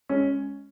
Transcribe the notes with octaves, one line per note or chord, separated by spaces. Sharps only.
G#3 C#4